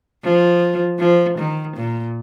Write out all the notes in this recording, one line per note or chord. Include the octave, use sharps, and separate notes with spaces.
F3
F3
D#3
A#2